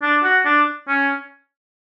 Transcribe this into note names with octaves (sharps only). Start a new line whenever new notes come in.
D4
F#4
D4
C#4